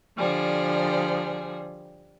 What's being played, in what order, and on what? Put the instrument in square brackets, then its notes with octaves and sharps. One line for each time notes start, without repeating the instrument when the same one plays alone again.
[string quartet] D3 F3 G3 G#4